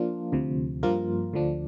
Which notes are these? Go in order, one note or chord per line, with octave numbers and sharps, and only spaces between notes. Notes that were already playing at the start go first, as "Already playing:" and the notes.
Already playing: F3 A#3 D4 F4
D2 C3 F3
G2 F3 A#3 F4 A#4
D2 D3 F3 D4